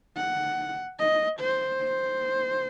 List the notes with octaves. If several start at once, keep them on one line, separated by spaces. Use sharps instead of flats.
F#5
D#5
C5
C5